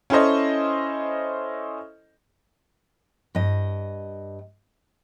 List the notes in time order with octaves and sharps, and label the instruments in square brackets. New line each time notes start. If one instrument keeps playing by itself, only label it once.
[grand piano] C#4 E4 A4 C5 D#5
[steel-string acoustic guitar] G2 D#5